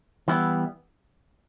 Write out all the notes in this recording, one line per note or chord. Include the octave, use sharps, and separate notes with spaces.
E3 G3 B3 E4